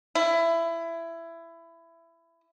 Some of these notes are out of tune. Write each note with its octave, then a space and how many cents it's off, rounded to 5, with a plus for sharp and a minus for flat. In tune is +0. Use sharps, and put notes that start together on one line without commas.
E4 +20